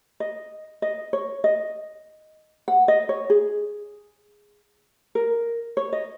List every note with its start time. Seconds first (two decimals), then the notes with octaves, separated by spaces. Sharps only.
0.20 D#5
0.82 D#5
1.13 C#5
1.44 D#5
2.68 F#5
2.88 D#5
3.09 C#5
3.30 G#4
5.15 A#4
5.77 C#5
5.93 D#5